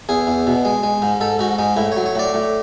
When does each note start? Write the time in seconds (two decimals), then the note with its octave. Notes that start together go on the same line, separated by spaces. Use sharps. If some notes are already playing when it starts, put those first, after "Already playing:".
0.09 E2 G#4
0.27 E2
0.47 B2
0.65 G#3
0.83 G#3
1.02 G#2
1.21 G#2 A4
1.39 G#2 F#4
1.59 G#2 G#3
1.77 A2 E4
1.92 F#3 C#5
2.06 C#5
2.15 A2 D5
2.34 A2